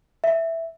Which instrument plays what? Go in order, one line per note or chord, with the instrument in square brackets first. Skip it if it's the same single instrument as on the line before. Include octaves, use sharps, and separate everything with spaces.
[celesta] E5